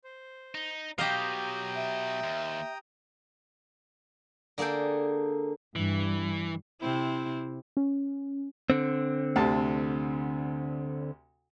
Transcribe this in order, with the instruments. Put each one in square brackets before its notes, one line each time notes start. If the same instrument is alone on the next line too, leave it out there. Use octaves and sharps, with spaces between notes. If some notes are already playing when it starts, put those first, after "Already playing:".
[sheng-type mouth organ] C5
[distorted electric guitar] D#4
[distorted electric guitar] B2 F#3 [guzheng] G4 D#5 F5 [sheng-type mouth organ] G5 A#5 D#6
[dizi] E5
[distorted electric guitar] D#2
[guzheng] D3 A#3 G#4 A4 G5
[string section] G2 [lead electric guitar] E3
[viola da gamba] C3 C4 E4
[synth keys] C#4
[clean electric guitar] D3 C4
[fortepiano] D2 C3 A5